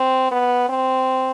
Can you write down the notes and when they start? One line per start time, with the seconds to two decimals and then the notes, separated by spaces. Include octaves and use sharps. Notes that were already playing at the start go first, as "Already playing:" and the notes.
Already playing: C4
0.31 B3
0.69 C4